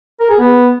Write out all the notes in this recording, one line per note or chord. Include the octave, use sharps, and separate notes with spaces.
A#4
G#4
B3